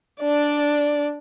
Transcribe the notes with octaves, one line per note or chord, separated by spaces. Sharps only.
D4 D5